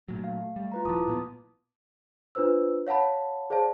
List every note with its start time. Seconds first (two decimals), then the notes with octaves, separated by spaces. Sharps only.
0.09 A#2 F#3 A3
0.24 F5
0.56 G3
0.72 F4 B4 A#5
0.85 D#1 F3 E4 A5 D6 D#6
1.08 A#2 G3 B3
2.35 D4 F4 B4 C5 E6
2.87 C#5 F5 F#5 A5 B5
3.50 G#4 C5 D5 F5 A5